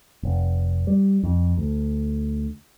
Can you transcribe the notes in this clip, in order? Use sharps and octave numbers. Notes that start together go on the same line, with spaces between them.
F1
G3
F2
D2